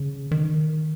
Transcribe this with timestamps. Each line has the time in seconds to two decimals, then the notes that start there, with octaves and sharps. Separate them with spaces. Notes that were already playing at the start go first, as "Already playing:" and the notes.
Already playing: C#3
0.31 D#3